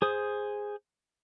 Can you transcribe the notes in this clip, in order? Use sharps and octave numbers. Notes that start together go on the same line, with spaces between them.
G#4 C5 D#6